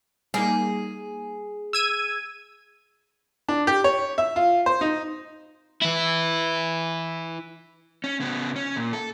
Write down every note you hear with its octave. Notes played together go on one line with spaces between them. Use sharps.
G3 A#3 D#4 G#4
E6 G#6 D#7
D4
G4
C#5
E5
F4
C5
D#4
E3 E4
C#4
C#3 B3
C#4
A#2
A4